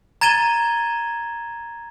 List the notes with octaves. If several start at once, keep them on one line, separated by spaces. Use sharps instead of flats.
A#5 G#6 A6 D#7 E7 G7